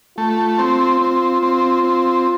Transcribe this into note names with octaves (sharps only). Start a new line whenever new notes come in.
A3 F4
C4
C4
C4
C4